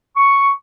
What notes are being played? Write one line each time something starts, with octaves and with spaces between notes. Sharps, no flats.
C#6